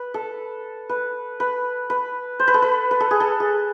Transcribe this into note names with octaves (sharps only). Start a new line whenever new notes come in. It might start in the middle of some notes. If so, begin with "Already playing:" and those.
Already playing: B4
A4
B4
B4
B4
C5
B4
A4
B4
B4
A4
G#4
A4
G#4